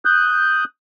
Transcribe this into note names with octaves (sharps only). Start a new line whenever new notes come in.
D#6 F#6 G6